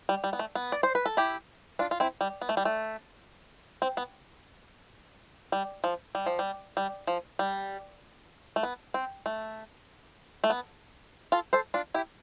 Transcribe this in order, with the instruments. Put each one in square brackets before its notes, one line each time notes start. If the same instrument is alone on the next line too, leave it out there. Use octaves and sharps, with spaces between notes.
[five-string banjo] G3
G3
B3
A3
B3
D5
C5
B4
A4
E4 G4
D4 F4
F4
C4 E4
G3
B3
A3
G3
A3
C4
B3
G3
F3
G3
F3
G3
G3
F3
G3
A3
B3
C4
A3
A3
B3
F4 A4
A4 C5
D4 F4
E4 G4